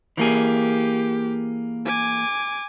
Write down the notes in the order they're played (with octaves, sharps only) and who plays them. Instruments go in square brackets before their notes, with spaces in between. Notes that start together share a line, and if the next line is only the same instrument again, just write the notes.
[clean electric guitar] E3 A#3 G#4 [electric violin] G4
[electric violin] G#5 D6